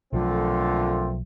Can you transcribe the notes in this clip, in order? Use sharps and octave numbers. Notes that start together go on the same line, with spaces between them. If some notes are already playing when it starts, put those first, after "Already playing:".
B1 A#2 D3 F3 F#3 A3 C4 F4